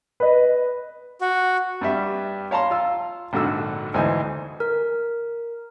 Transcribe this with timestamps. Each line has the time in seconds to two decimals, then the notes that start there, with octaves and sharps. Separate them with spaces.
0.20 B4 D#5
1.21 F#4
1.81 G2 G3 E5
2.51 C#5 F5 A5 A#5 C6
2.71 F4 F5 E6
3.33 A#1 G#2 D3 F#4 E6
3.94 D2 G#2 E3 D#4 C5 G#5
4.60 A#4